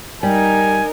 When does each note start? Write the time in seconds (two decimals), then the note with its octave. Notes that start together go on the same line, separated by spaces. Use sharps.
0.23 G3 D#4 A#4 G#5